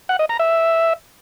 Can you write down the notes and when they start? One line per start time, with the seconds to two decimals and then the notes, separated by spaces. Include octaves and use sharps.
0.09 F#5
0.19 D#5
0.29 A#5
0.39 E5